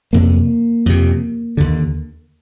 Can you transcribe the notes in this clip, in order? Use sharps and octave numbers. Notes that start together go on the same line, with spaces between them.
F2 C3 A#3
F2 C3
D#2 D3